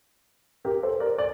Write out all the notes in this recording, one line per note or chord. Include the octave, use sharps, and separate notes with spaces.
G4 A#4
A4 C5
A#4 D5
D5